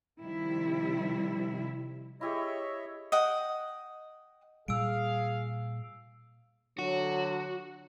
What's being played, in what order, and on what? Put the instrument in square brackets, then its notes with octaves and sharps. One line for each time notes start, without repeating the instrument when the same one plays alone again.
[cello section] C3 D#3 F3 G3 E4
[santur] E4 G4 G#4 [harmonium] C#5 D#5 E5
[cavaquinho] D#5 F#5 G5
[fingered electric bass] A#2 G3 [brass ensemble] G#4 F5 [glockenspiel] E6 D7
[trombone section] D3 F#3 [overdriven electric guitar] F#4